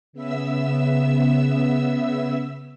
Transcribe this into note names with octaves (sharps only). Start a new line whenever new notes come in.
C#3 B3 E5 E6